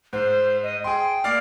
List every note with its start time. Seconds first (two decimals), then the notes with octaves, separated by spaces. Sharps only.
0.13 G#2 C5
0.63 D#5
0.84 G#4 G5 C6
1.24 A#3 D5 F5